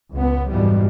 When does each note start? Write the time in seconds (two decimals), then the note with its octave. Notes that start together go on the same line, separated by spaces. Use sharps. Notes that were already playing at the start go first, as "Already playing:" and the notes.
0.13 C#2 B3
0.50 F2 G#2 B2 E3 G3